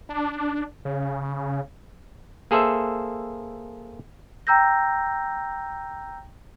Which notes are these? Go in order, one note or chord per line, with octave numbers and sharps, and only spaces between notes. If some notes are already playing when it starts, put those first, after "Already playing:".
D4
C#3
A#3 G#4 A4 C5 E5
G5 A#5 E6 G6 A#6